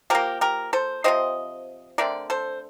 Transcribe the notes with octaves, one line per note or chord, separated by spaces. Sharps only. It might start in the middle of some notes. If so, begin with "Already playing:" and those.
F3 A#3 G4 A#4
G4 A#4
A4 C5
C3 F3 C4 C5 D#5
D3 A3 C4 A#4 D5
A4 C5